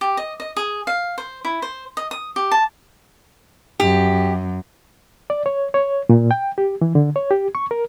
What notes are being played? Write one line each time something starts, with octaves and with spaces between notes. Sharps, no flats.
G4
D#5
D#5
G#4
F5
C5
E4
C5
D#5
D#6
G4
A5
F#2 G4
D5
C#5
C#5
A#2
G5
G4
E3
D3
C#5
G4
C#6
A#4